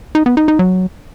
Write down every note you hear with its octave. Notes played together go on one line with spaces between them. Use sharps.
D#4
B3
D#4
D#4
F#3